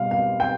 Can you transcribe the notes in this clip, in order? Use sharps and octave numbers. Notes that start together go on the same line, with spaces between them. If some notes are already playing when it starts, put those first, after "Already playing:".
Already playing: B2 G3 F5
F5
G5